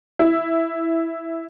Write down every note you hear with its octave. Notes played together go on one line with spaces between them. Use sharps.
E4